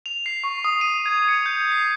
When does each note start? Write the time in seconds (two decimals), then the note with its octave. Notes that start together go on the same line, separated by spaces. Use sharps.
0.06 F7
0.26 C7
0.44 C#6
0.65 D#6
0.81 D#7
1.06 G#6
1.28 C#7
1.46 G6
1.72 C7